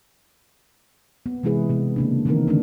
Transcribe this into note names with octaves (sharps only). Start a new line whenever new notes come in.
B3
C3 E3 G#3 E4 G#4 B4
C3 B3
C#3 A#3 D4
D#3 E3 B3 C4 D#4 A#4
D3 D#3 A3 C4 D4